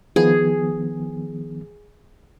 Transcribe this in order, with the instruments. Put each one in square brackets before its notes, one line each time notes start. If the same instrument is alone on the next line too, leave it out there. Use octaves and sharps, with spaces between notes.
[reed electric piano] D#3 F3 B3 [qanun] G#4